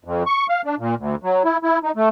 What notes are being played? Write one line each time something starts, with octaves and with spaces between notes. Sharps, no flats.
F2
C#6
F5
D4
A#2
D2
F#3
E4
E4
D#4
A3